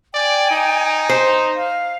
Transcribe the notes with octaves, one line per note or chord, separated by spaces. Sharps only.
D5 G5 G#5
D#4
C5
F5